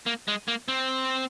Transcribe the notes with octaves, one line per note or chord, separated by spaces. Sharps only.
A#3
G#3
A#3
C4